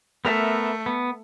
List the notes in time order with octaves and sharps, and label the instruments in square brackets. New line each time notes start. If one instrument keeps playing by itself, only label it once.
[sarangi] A3 [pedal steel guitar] B3 A#4 E5
[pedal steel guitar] B3